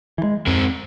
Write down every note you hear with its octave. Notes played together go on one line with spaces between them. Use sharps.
E3
G#3
F2 G#3 C4